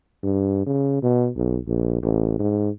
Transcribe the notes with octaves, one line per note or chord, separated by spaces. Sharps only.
G2
C#3
B2
B1
A#1
A1
G#2